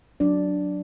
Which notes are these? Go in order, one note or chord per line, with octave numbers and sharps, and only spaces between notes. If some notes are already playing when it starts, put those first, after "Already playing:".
F#3 D4 D5